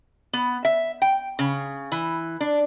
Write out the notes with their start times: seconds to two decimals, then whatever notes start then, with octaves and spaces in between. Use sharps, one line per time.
0.33 B3
0.65 E5
1.02 G5
1.39 C#3
1.92 E3
2.41 D4